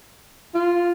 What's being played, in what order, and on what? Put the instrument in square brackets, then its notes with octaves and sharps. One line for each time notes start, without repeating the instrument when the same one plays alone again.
[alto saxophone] F4